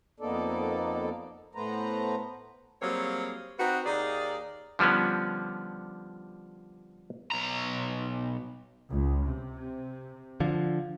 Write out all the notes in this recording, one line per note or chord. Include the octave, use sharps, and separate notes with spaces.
F2 A#3 B3 D#4 A4 D5
A2 A3 B3 B4 C5 A#5
F#3 G3 A#3 C4 G#4 C#5
C4 D#4 F#4 B4
D#2 D#4 G#4 D5
D3 F3 G3 B3 C#4
B1 A#5
C#2
C3
D3 F3